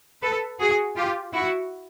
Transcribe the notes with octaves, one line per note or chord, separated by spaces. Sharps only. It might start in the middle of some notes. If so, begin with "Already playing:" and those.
A4 B4
F#4 G#4
F4 G4
E4 F#4